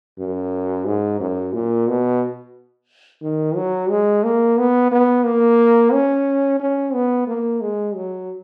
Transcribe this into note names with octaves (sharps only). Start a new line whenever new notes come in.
F#2
G#2
F#2
A#2
B2
D#3
F#3
G#3
A#3
B3
B3
A#3
C#4
C#4
B3
A#3
G#3
F#3